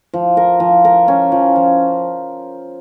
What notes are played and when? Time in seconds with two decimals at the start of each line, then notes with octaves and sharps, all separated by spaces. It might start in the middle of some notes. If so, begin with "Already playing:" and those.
0.14 F3
0.37 A#4
0.60 F3
0.85 A#4
1.08 C#4
1.32 F3
1.56 F3